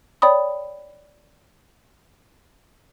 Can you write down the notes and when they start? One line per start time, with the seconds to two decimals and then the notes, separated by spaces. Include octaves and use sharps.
0.22 C#5 D5 G5 B5 D#6